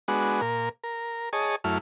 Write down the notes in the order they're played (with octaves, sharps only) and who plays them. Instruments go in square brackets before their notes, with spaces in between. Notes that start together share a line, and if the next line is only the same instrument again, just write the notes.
[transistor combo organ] G#3 B3 D4 F#4
A#2 A#4
A#4
G#4 C#5 D#5 A5
F#2 A3 E4 F6